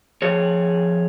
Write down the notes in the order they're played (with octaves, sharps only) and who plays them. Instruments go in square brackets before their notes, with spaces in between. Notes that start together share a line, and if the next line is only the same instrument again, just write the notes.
[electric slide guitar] F2 G#4 C#5